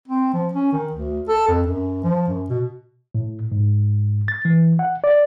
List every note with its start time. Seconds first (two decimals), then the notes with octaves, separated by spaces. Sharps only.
0.08 C4
0.33 F3
0.53 C#4
0.73 D#3
0.92 D2
1.28 A4
1.48 F2
1.67 F#2
2.04 F3
2.28 F#2
2.49 B2
3.15 A2
3.52 G#2
4.28 A6
4.45 E3
4.79 F#5
5.04 D5